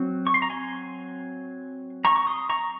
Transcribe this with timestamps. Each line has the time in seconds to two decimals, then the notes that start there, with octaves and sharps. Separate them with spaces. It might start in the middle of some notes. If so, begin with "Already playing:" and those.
Already playing: F#3 C4
0.27 C#6
0.34 C6
0.42 A#5
0.50 G#5 C6
2.05 A#5 C#6
2.16 C#6
2.27 C6 D#6
2.50 A#5 C#6